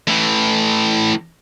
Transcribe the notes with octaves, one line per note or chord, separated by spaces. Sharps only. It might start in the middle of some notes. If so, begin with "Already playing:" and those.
A2 E3